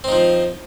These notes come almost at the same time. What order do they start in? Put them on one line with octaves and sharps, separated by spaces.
C4 D#4 F3